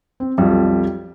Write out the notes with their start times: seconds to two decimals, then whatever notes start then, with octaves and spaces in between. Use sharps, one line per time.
0.20 C4
0.38 B1 F2 G3